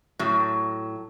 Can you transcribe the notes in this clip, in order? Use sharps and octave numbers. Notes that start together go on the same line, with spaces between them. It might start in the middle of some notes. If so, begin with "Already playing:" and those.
A2 F#3